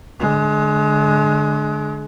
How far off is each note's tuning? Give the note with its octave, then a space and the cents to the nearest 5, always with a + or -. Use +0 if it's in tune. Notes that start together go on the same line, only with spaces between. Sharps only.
D3 +0 G#3 +30